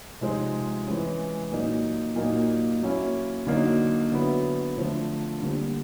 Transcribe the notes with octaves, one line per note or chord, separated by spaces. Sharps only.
C3 F3 G#3 C4 D#4
E3 G#3 C#4
A#2 F#3 A#3 D#4
A#2 F#3 A#3 D#4
F#3 A#3 C#4 E4
D3 F#3 A#3 D#4
D3 F#3 B3 E4
D3 F3 A3 C4
D3 G3 A#3